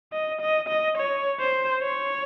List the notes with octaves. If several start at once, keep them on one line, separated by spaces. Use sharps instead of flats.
D#5
D#5
D#5
C#5
C5
C#5